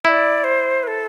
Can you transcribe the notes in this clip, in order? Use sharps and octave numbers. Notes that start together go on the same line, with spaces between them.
E4 D5 E5
C5
B4
A4